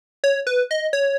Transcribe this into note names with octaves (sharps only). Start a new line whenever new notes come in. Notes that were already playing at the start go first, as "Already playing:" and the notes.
C#5
B4
D#5
C#5